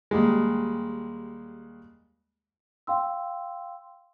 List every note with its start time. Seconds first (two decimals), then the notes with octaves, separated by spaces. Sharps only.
0.11 D#2 G3 G#3
2.87 F5 G5 C6 E6